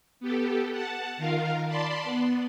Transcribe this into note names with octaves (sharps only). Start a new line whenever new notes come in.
B3 G4 A4
F#5 A5
D#3 F4 A#4 F5
D5 A5 B5 C6
B3